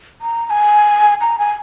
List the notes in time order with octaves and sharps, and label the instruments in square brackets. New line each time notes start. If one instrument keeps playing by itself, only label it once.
[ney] A#5
A#5
G#5
A#5
G#5